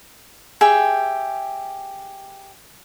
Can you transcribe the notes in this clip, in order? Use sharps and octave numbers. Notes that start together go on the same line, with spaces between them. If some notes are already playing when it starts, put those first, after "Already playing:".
G4 G#4 E5 G5